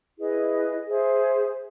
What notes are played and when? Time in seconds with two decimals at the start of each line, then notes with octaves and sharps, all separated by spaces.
0.18 E4 G#4 B4 D#5
0.87 G#4 C5 E5